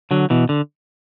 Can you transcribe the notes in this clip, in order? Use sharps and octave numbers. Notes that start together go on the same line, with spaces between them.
D3 F#3
B2 E3
D3